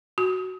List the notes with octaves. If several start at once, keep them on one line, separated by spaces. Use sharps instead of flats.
F#4